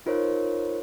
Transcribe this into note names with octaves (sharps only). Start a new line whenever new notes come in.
D#4 F4 A#4 C5 C#5